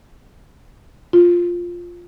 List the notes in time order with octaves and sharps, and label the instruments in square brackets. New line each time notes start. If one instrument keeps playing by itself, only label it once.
[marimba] F4